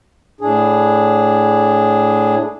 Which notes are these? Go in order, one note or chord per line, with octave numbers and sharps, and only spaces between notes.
A2 D4 G#4